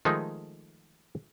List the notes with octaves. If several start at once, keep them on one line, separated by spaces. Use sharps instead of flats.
D#3 F3 G#3 A3 D#4